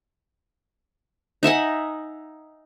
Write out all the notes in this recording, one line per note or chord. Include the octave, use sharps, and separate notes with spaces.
D#4 E5 F#5 G#5